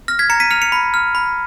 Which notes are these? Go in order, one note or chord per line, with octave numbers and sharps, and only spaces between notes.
F6 A#6
G#6 B6
A#5 A#6 C#7
B6 D#7
F6 C#7 F7
C#7 F7
B5
F6
B5